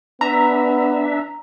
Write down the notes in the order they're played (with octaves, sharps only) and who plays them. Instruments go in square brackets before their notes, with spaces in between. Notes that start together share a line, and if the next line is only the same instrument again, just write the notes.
[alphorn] B3 [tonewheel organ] D4 E5 [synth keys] A#5